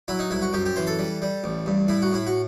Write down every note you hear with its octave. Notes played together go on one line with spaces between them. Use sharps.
F#3 E4
D#4
C2 E4
F#4
F#2 G4
G4
E3 C5
A4
G3
G3
A1
G2
A2 E4
F#4
A2 E4
F#4